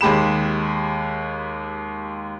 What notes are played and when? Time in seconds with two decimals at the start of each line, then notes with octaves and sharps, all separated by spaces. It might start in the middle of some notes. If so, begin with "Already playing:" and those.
0.01 D#2 G#3 G4 B5 E7